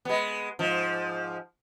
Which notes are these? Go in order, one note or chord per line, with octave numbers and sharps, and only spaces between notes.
G#3 B3
G#2 F3